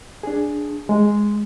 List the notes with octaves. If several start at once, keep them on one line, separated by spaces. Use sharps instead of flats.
D4 G#4
G#3